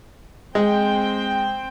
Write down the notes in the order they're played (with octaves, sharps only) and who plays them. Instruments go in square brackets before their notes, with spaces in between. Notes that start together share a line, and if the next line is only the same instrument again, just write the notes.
[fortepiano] G#3 [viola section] C4 G5